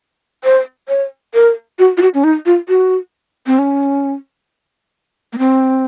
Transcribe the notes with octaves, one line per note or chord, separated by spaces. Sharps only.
C5
C#5
A#4
F#4
F4
F#4
C#4
D#4
F4
F#4
C4
C#4
A#3
C4